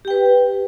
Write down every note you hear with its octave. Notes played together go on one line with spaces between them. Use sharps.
G4 B4 G5